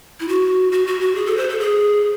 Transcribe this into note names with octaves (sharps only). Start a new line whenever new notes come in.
E4
F#4
F#4
F#4
F#4
G#4
A4
C5
A4
G#4